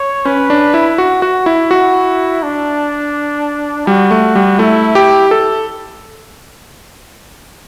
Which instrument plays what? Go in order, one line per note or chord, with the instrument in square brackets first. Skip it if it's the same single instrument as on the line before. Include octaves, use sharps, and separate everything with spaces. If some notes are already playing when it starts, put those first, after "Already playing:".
Already playing: [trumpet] C#5
[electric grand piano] C#4 [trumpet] B4
[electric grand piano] D4
E4
F#4
F#4
E4
[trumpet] E4 [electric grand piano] F#4
[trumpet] D4
[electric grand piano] G3 [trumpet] F#4
[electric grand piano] A3
G3
[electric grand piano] A3 [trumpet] E4
[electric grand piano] G4
A4